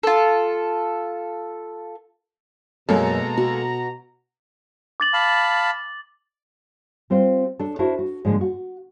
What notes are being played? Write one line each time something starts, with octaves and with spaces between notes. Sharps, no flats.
F4 A4
F#2 B2 G#3 A#3 A4 A#5
F#4
D6 A6 F#7
F5 A5 B5
G3 C4 F4 C5
D4 A4
D4 E4 F#4 A#4 C5
F#4
G#2 D3 F3 G#3 A#3
F#4